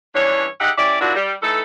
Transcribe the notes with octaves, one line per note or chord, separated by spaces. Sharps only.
G2 E3 C#4 D4 C#5
D#4 G4 G#4 E5 F#5
C#4 E4 G4 D5
F3 F#3 A#3 D4 E4 F#4
G3
E3 A3 D#4 A4